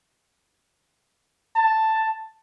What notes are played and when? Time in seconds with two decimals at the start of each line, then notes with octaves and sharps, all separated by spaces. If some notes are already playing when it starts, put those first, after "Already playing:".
1.56 A5